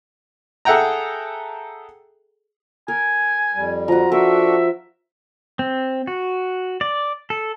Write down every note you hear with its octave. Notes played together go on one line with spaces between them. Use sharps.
G#4 A4 E5 F#5 G5 A#5
A#4 G#5
F2 G3
F3 F#4 A#5
D4 F#4 A4 A#4 E5
C4
F#4
D5
A4